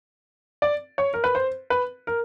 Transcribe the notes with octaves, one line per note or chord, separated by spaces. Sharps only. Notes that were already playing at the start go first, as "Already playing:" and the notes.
D5
C#5
A#4
B4
C5
B4
A#4